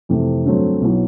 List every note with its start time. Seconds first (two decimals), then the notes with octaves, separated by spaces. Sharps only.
0.09 F2 C3 E3 A3
0.45 G2 D3 F#3 A3 C4
0.81 B1 B2 F#3 B3 E4